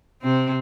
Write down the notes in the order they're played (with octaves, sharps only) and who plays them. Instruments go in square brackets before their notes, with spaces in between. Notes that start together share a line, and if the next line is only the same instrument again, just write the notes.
[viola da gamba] C3 C4